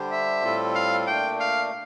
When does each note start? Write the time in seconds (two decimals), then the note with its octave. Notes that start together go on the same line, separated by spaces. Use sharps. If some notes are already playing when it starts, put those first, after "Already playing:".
Already playing: D3 G3 D4 G4 C5
0.11 E5
0.44 A2 G3 C4 F4 A4
0.75 F5
1.07 A#2 A3 D4 G5
1.40 F5